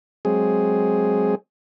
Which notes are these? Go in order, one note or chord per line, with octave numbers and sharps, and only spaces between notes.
F#3 G#3 C4 G#4